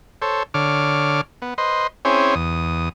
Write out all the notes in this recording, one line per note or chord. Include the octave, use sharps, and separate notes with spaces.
A4 C5 C#5
D3 C#5 D6 F6
B3
B4 C5 D#5 C6
C4 C#4 E4 G#4 C5 C#5
E2 D#6